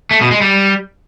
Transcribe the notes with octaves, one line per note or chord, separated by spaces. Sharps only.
A3
B2
G#3
G3